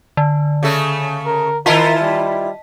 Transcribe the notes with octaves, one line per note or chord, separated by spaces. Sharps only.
D3
C#3 A3 A4
A#4
D#3 E4 F4 A#4 D#5 A5 B6
G3